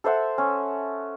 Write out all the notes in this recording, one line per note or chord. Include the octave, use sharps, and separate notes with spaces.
A4 C5 E5 F#5
C#4